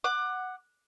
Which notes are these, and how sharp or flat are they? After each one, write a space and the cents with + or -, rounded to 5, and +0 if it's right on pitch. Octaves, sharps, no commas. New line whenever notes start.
F#5 +0 D6 +25